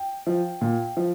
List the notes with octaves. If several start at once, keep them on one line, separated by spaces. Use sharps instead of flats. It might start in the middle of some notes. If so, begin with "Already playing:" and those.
Already playing: G5
F3
A#2
F3